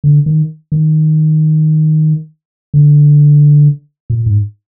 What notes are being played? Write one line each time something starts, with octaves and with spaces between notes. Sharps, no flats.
D3
D#3
D#3
D3
A#2
G#2